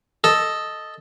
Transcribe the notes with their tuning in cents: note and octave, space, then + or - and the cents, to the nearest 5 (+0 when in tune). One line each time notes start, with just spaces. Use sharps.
A4 +0 D#5 +0